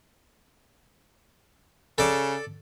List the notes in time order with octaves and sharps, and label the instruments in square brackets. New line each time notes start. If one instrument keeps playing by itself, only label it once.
[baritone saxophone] C#3 [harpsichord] A4 D5